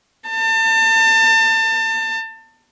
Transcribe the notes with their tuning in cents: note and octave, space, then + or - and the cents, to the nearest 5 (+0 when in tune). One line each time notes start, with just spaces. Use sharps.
A5 +30